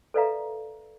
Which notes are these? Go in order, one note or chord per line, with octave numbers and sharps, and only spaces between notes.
A4 B4 D5 E5 F5 A#5